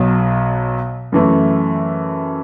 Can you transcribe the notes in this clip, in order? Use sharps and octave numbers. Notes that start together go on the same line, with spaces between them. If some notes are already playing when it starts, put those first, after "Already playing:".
Already playing: B1 B2 F#3
F#2 E3 A3